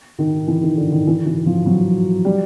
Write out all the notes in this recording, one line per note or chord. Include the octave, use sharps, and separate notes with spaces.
D#3
E3
D#3
D3
D#3
E3
E3
F3
F#3
G3